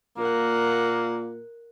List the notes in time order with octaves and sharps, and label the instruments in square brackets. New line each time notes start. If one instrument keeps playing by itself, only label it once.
[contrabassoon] A#2 [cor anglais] A#3 [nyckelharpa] A#4 F#5